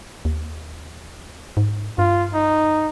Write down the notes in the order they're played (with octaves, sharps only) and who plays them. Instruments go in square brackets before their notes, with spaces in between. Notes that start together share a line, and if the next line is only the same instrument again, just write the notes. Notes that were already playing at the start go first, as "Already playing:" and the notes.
[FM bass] D#2
G#2
[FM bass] G2 [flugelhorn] F4
[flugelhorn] D#4